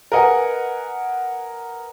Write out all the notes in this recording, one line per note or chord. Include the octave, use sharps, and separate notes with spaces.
A#4 B4 D#5 F#5 G#5